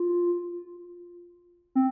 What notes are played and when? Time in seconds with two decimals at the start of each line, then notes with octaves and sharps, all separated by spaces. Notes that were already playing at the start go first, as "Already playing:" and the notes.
Already playing: F4
1.75 C4